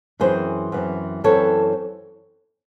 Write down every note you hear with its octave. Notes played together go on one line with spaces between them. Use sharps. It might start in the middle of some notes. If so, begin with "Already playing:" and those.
F#2 E3 C4 G#4 C5
F#2 E3 C4
F#2 E3 C4 A4 C#5